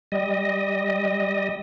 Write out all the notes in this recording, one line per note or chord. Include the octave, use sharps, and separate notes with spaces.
G3 D#5